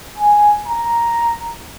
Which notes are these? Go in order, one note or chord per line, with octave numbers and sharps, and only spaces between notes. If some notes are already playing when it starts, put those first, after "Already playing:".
G#5
A#5